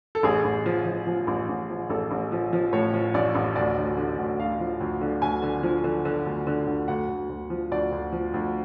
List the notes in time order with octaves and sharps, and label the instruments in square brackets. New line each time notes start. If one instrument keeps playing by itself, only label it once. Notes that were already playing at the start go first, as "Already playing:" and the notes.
[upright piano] A4
A1 G#4
A1
F3
F3
F3
A1
A1
F3
A1 A4
A1
F3
F3
A2 C#5
F3
A1 D5
A1
D2 D5
D2
D3
D2
D2 F5
F3
D2
D3
D2 G#5
D3
F3
D3
D3
D2
D3
D2
D2 F#5
D2
D2
F3
D2 D5
D2
F3
D2